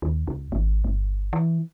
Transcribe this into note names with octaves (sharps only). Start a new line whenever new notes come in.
D#2
C#2
G#1
G1
E3